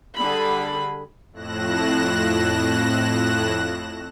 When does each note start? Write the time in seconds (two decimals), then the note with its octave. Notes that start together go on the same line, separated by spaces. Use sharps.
0.16 D3 G3 G#4 B5
1.32 F2 A2 F#6 A#6 E7